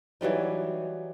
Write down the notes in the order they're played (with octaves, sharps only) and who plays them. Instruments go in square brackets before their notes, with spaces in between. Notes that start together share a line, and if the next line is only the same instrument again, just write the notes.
[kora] E3 F#3 G3 D#4